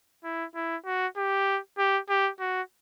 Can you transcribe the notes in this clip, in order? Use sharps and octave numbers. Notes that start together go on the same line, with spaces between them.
E4
E4
F#4
G4
G4
G4
F#4